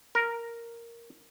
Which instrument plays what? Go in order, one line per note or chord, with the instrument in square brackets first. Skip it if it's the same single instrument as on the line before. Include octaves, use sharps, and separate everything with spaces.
[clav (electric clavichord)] A#4